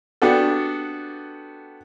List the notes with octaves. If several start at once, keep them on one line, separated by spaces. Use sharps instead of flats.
B3 D4 F#4 G4 A4